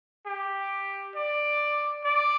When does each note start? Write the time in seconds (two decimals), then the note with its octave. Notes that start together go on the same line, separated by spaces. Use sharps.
0.27 G4
1.15 D5
2.05 D5